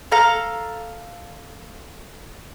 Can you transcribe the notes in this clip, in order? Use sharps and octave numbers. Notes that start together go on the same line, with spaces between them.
A4 F5 A#5